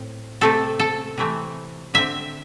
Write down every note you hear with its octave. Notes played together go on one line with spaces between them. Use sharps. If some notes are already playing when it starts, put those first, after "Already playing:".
Already playing: A2 C4
C3 A3 C4 A4
A4
C3 E3 A3 C4
D3 C4 E5